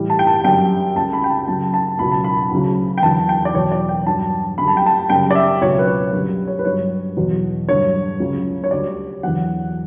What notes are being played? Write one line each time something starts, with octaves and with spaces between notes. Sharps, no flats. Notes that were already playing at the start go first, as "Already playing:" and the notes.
Already playing: A2 E3 G3
A5
G5
A5
F#2 D3 G3 G5
C#2 C#3 G3 A5
B5
G5
A5
F#2 C#3 F#3 A5
A5
C#2 B2 F#3 B5
A5
B5
D2 C#3 F#3
G5
E2 D3 F#3 A5
G5
D5
E2 B2 F#3 C#5
D5
G5
G2 F#3 A5
F#2 D3 G3 B5
A5
G5
A5
F#2 C#3 G3 G5
D5
E5
C#2 B2 F#3 C#5
B4
C#5
F#2 D3 G3 B4
C#5
B4
G2 F#3 C#5
E2 B2 F#3
G2 D3 F#3 C#5
C#2 C#3 F#3
C#5
D2 D3 G3 D5
E2 D3 F#3 F#5